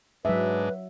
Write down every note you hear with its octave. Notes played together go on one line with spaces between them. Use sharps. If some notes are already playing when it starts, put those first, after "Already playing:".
G#2 F#3 G#3 D4 B4 E5